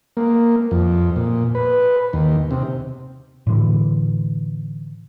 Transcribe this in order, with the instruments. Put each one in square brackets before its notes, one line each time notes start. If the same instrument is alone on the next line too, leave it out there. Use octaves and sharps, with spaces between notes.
[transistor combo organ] A#3
F2
A#2
B4
D#2
C3
[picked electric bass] A2 D3 E3